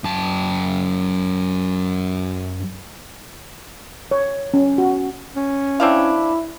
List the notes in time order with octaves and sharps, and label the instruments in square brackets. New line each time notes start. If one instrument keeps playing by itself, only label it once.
[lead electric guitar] F#2 A5
[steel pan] C#5
C#4
F#4
[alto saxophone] C#4
[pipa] C4 D4 F5 [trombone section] E4